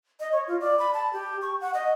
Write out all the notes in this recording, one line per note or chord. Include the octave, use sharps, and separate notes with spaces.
D#5
C#5
F4
D5
B5
A5
G4
C#6
F#5
D#5